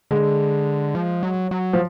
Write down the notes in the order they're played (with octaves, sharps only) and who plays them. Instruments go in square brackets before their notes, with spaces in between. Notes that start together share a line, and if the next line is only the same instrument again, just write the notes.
[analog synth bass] D3 [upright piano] G#3
[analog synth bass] F3
F#3
F#3
[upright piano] F3